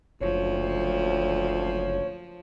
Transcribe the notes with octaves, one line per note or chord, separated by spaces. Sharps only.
F#1 D2 F3 C#5